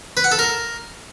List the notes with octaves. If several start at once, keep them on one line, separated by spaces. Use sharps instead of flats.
B4
F#5
A4
A#4